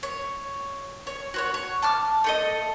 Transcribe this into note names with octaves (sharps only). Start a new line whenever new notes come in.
C#5
C#5
F#4 C5 C#5
C#5
A5 D6 F6
A3 A4 D#5